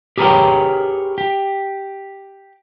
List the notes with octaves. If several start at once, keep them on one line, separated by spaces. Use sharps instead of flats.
G4 G#4 A#4 B4 C#5 G5
G4